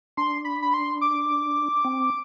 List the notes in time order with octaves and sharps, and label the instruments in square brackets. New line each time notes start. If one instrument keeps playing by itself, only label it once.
[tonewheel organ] D4 [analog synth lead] C6
[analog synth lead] B5
B5
C6
D6
[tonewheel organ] C4